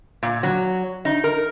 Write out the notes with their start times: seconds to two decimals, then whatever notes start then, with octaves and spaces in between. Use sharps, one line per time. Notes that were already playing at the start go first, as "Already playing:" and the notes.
0.23 A#2
0.43 F#3
1.05 D#4
1.24 A#4